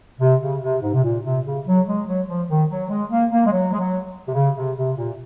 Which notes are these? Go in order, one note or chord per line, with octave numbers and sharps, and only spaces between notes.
C3
C#3
C3
G#2
C3
A#2
C3
C#3
F#3
G#3
F#3
F3
D#3
F#3
G#3
A#3
A#3
G#3
F#3
G#3
F#3
C3
C#3
C3
C3
A#2